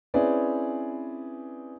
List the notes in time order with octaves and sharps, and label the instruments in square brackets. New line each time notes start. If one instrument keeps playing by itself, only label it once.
[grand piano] C4 C#4 E4 G#4 B4 D5